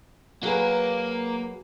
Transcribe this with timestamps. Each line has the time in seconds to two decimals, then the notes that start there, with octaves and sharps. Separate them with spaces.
0.43 F#3 A#3 G#4 B4